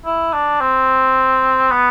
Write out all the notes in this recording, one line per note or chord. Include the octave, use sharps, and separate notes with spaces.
E4
D4
C4
B3